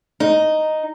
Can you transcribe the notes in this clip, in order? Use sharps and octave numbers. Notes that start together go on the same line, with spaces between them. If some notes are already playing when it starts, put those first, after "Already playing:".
D#4